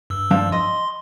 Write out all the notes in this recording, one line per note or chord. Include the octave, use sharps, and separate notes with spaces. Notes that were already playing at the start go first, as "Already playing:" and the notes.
G2 E6
F3 D4 F5
D#5 C6